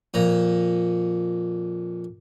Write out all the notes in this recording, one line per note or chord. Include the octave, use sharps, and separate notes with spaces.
F2 A#2 A#5